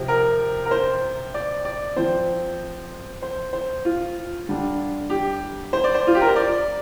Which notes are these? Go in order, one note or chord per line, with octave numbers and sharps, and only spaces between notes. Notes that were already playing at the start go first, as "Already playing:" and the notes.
Already playing: C3 F3 C4
A#4
A#4
C5
D5
D5
F3 C4 C5
C5
C5
F4
D3 G3 D4
G4
C5
D5
C5
F4
G4
A#4
C5
D5